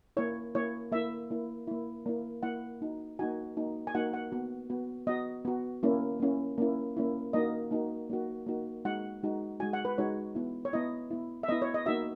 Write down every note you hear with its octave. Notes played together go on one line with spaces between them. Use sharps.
A#3 E4 C#5
A#3 E4 C#5
A#3 E4 E5
A#3 E4
A#3 E4
A#3 E4
A#3 E4 F#5
A#3 D#4 F#4
A#3 D#4 F#4 G#5
A#3 D#4 F#4
G#5
A#3 D#4 F#4 F#5
F#5
B3 F#4
B3 F#4
B3 F#4 D#5
B3 F#4
A#3 C#4 E4
A#3 C#4 E4
A#3 C#4 E4
A#3 C#4 E4
A#3 D#4 F#4 D#5
A#3 D#4 F#4
A#3 D#4 F#4
A#3 D#4 F#4
G#3 D#4 F#4 F#5
G#3 D#4 F#4
G#3 D#4 F#4 G#5
F#5
B4
G#3 D#4 F#4 C#5
B3 E4
C#5
B3 E4 D#5
B3 E4
E5
B3 E4 D#5
C#5
D#5
A#3 D#4 F#4 E5